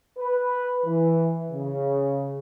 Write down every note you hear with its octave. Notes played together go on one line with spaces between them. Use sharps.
B4
E3
C#3